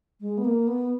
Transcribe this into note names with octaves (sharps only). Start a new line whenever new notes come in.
G#3
B3
A#3
B3